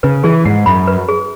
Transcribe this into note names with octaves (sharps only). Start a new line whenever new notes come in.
C#3 B4
E3 G#4
G#2 F#5
F#2 B5
B4
G#4